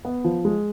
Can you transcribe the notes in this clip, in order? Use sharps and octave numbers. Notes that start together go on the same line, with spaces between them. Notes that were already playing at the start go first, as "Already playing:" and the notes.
B3
F3
G#3